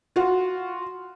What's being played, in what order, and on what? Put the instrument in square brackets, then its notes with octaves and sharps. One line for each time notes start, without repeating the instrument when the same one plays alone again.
[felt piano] F4 F#4